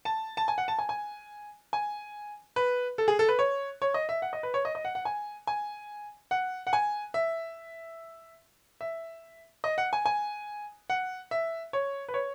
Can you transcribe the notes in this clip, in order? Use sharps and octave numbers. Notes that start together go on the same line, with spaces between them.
A5
A5
G#5
F#5
A5
G#5
G#5
G#5
B4
A4
G#4
A4
B4
C#5
C#5
D#5
E5
F#5
D#5
B4
C#5
D#5
D#5
F#5
F#5
G#5
G#5
F#5
F#5
G#5
E5
E5
D#5
F#5
G#5
G#5
F#5
E5
C#5
B4
C#5